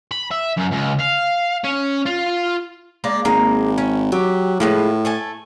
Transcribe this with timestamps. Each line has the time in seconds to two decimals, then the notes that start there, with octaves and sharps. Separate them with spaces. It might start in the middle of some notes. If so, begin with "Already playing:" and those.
0.11 B5
0.31 E5
0.57 F#2
0.71 C#2
0.99 F5
1.64 C#4
2.06 F4
3.04 G#3 A#3 D4
3.25 G#1 A#3 G#4 A#5
3.78 C#4
4.12 F#3 G4
4.60 A2 F3 G#3 B3
5.05 A3 G#5 A5